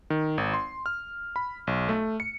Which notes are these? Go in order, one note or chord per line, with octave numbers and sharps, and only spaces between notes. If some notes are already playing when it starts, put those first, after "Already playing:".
D#3
G#1
C6
F6
B5
B1
A3
C#7